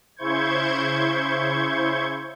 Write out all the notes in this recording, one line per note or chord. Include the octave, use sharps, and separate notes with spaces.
C#3 E4 C5 C#6 G6 G#6